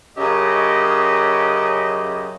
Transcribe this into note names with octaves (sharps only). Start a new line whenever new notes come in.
F#2 C#3 C#4 G4 D#5